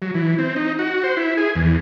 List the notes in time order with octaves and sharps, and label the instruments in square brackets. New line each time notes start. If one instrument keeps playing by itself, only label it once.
[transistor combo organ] F#3
E3
C4
D#4
F#4
C5
E4
G#4
E2